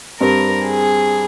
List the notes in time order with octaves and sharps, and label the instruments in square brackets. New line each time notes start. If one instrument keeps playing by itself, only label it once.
[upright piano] G2 G3 C4 [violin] A#4
[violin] G#4